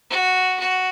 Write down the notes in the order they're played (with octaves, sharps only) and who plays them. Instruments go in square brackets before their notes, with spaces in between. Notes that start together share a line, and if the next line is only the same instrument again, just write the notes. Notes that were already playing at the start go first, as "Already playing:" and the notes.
[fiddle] F#4
F#4